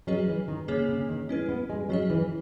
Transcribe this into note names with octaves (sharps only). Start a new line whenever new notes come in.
F#3 C#4 G#4 B4 D#5
E3
D#3
C#3 A#3 C#4 G#4 C#5
C#3
D#3
G#3 C#4 E4 B4
B3
G#3
F#3 C#4 G#4 D#5
E3